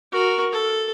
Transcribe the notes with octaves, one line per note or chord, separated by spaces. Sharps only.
F#4 A#4
A4